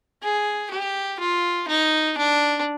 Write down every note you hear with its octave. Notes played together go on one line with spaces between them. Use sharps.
G#4
G4
F4
D#4
D4